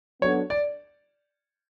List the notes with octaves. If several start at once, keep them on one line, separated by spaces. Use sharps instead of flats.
F#3 B3 D4 F#4 A4 C#5
D5